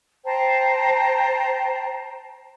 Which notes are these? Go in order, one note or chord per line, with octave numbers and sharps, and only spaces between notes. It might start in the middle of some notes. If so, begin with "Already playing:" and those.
C5 G5 A5 A#5